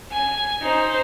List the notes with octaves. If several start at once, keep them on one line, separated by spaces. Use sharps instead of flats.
G#5
D#4 C5